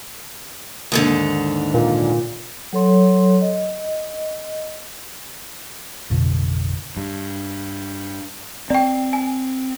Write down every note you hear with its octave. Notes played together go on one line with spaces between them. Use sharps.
D#2 G#2 D3
A#2
F#3 A4 C#5 C6
D#5
A1 F2 B2 D3
G2
C4 D5 G5
G#5